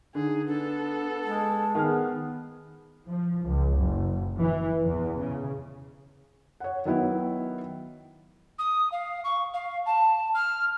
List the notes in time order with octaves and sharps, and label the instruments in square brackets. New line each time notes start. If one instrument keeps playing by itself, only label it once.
[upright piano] D3 [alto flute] D#4 [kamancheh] G#4
[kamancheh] B3 A4 [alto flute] D4
[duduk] G#3 [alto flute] A5
[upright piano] D#3 G#4 F6 [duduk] B3
[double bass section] F3
C#2
F#1
E3
E2
C#3
[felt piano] C#5 F#5
D#3 F#3 B3 E4
[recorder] D#6
F5
C#6
F5
A5
F6